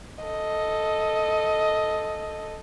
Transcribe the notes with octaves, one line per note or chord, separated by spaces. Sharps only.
A4 D#5